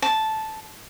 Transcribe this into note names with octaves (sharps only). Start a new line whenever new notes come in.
A5